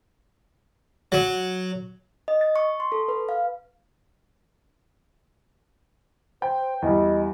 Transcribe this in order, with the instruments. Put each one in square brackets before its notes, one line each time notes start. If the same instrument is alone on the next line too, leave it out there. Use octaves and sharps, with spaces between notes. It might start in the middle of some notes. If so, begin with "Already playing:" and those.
[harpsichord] F#3
[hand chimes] D#5
A6
C#6
C6
A4
B4
F5
[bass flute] C5 [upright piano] G5
[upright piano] E2 G3 [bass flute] D#5